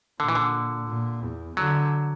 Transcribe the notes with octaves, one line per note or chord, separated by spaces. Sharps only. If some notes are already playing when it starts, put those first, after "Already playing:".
A#2 D3
E3
D3
A#2
E2
D3 F#3